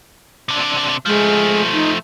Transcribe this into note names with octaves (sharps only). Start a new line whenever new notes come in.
C3 D4
F3 G#3 A3
D#4